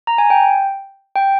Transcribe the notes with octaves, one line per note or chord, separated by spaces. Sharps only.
A#5
G#5
G5
G5